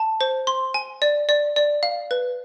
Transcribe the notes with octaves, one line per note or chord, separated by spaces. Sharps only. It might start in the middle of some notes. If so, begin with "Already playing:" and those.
Already playing: A5
C5
C6
G#5
D5
D5
D5
F5
B4